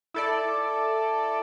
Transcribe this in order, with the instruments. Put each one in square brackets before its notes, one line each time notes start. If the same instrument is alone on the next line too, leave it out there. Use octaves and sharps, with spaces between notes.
[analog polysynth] E4 A4 D5